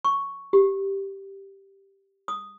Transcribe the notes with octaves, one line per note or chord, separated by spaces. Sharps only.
C#6
G4
D#6